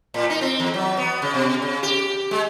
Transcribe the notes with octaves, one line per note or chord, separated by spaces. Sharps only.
A2
D#4
C4
E2
F#3
B3
C#3
B2
C#3
G4
G#3